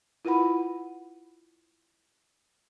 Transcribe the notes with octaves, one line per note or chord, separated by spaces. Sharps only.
E4 F4 B4 F#5 B5